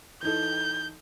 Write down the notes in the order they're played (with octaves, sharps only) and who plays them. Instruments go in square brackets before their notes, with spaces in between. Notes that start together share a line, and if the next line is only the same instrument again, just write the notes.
[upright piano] E3 D#4 A4 [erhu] G6